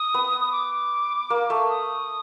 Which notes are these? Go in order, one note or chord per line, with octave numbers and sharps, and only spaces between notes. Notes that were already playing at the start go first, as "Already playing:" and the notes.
Already playing: D#6
B3
D#6
D6
A#3
A3
D#6